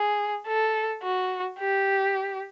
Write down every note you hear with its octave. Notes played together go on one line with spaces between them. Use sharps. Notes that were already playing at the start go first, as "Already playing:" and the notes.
Already playing: G#4
A4
F#4
G4